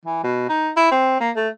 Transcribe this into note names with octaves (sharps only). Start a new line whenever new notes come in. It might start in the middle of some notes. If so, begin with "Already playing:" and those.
E3
B2
D#4
E4
C4
A#3
A3